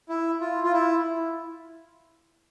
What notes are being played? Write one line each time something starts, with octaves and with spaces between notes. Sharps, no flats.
E4
F4
F4
E4